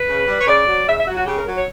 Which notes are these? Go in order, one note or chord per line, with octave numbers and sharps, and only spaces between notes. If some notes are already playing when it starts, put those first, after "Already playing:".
Already playing: B4
C#3
G3
C#5
C#3 D5
F#3
C#3 E5
E5
F#3 F#4
F#4
C#3 G4
A#4
F#3
C#5